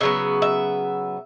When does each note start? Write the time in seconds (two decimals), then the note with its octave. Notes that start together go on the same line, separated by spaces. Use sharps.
0.01 C#3 F#3 B3 E5
0.42 E5